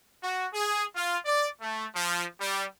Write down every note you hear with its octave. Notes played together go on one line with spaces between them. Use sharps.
F#4
G#4
F4
D5
A3
F3
G3